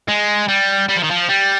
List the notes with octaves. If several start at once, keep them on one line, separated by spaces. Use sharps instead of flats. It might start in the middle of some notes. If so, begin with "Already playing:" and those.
G#3
G3
G3
F3
D#3
F3
G3